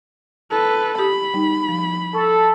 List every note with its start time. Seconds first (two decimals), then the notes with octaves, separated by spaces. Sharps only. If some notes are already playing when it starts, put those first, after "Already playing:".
0.51 A4 B4
0.98 G4 B5 D#6
1.34 G3 D#4
1.69 F3
2.14 A4 C#6